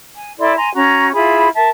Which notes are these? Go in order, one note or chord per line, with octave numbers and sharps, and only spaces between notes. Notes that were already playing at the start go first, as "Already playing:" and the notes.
G#5
E4 A4 D5 C6
G#5 A#5 C6
C#4 F#4 A#5
E4 F4 G#4 B5
A#4 E5 A5